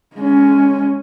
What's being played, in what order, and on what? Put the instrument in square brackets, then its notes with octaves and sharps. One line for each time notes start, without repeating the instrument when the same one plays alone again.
[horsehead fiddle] G#3 C#4